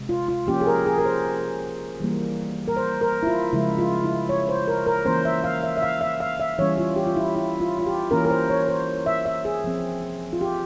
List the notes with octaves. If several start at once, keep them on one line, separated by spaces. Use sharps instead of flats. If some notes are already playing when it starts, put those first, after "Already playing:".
Already playing: C3 G#3
F4
F4
F3 A#3 C#4 G4
G#4
A#4
G#4
A#4
C5
E3 G3 A#3
A#4
C5
A#4
E4
F4
C#3 F3 G#3 E4
F4
E4
C#5
C5
A#4
A#4
E3 A#3 C#4 C5
E5
F5
E5
E5
F5
E5
F5
E5
E3 G3 C#4 C#5
F4
G4
F4
E4
E4
F4
F4
G4
E3 A#3 C#4 A#4
A#4
C5
C#5
C5
E5
E5
G#4
F3 C4
F4
G4